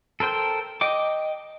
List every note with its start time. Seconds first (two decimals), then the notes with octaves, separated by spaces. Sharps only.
0.20 A4 A#4 C5 G5
0.81 D#5 G5 D6